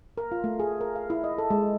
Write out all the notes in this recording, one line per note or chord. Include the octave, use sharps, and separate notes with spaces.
A#4
F4
A3
G#4
A#4
F5
E4
D#5
A4
G#3